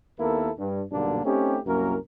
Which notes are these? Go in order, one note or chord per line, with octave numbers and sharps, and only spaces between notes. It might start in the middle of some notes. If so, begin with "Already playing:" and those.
D#2 A#3 B3 E4 A4 A#4
G2
B1 G2 A#2 D3 A#3 D4
A3 C4 C#4 D#4 G4
C2 F#2 A#3 C#4 A#4